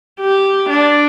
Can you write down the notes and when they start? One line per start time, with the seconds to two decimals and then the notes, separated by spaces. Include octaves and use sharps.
0.21 G4
0.70 D4